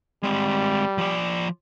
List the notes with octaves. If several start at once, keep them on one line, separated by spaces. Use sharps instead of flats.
G3 G#3 C4
F3 D5